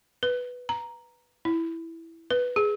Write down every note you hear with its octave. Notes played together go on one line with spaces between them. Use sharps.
B4
A#5
E4
B4
G#4